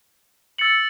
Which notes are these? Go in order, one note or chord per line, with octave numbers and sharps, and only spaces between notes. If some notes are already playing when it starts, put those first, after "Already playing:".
E6 A6 C#7 F#7